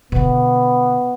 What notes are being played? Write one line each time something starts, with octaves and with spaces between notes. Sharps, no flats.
B2 D3 B3